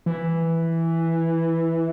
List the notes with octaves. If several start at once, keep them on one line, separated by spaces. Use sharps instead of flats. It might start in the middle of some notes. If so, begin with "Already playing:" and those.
E3